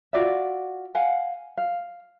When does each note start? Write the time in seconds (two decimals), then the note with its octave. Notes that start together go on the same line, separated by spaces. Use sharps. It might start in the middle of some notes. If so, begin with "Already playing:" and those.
0.13 F4 F#4 D5 E5
0.95 F5 F#5 G#5
1.57 F5